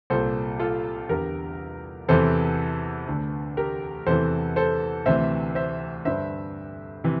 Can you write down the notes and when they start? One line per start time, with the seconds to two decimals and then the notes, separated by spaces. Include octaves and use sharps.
0.10 C2 A#2 A4 C5
0.59 F4 A4
1.09 E2 D3 G4 A#4
2.08 E2 C3 E3 A4 C5
3.07 D2 D3
3.57 G4 A#4
4.06 E2 C3 E3 A4 C5
4.56 A4 C5
5.05 D2 C3 E3 C5 E5
5.55 C5 E5
6.05 G2 D3 C5 E5
7.04 C3 E3